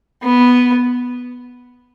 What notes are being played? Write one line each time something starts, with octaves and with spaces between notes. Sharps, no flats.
B3